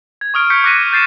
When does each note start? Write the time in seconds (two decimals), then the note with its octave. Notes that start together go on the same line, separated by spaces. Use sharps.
0.21 G#6
0.34 C#6 D#6 F6 D7
0.50 C#6 G6 B6 C#7
0.64 D6 F#6 A#6 B6 D#7
0.93 G6 A6 C7 D#7 E7